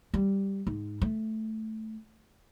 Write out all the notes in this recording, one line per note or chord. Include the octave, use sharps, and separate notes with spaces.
G3
G#2
A3